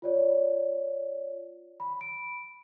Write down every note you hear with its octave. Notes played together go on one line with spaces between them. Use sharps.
F4 C#5 D5
B5
D7